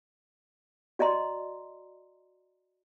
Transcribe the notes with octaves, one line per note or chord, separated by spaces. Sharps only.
F#4 D5 D#5 A#5 C6